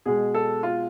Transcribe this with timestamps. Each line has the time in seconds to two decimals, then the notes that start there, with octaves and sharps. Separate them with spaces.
0.06 B2 G#3 G#4
0.34 A4
0.63 F4